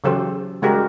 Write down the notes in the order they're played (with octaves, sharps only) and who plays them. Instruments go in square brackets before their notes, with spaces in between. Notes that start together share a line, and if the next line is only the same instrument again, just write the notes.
[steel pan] C#3 E3 F#3 G4 A4 C5
C#3 G3 G#3 F#4 G4 A#4